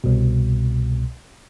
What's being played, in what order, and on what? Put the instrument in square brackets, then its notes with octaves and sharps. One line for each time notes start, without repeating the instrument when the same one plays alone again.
[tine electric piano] C2 B2